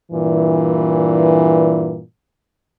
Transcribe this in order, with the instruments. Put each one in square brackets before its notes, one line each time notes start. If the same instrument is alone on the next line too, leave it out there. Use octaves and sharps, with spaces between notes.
[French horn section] G2 A#2 E3